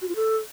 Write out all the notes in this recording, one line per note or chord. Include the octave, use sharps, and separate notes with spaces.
F#4
F4
A4